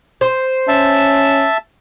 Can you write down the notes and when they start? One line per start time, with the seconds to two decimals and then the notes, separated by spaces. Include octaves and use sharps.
0.21 C5
0.68 C#4 E5 A5